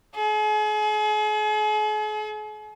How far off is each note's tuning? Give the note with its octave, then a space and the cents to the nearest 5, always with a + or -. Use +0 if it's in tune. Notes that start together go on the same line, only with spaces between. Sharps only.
G#4 +40